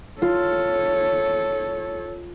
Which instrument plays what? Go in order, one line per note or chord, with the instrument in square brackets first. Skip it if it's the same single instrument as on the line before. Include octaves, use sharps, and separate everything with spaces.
[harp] F4 [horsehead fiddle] A4 C#5